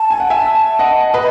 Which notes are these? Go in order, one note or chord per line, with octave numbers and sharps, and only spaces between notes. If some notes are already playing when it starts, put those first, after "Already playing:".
Already playing: A5
G#5
F#5
E5 G#5
D#5 F#5
B4 D#5